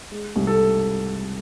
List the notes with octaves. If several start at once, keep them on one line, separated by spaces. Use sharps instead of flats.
G#3
C2
A4